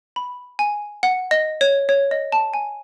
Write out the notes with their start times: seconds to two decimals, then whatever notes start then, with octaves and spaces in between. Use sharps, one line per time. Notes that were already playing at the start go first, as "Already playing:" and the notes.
0.16 B5
0.59 G#5
1.03 F#5
1.31 D#5
1.61 C#5
1.89 C#5
2.11 D#5
2.32 A5
2.54 G#5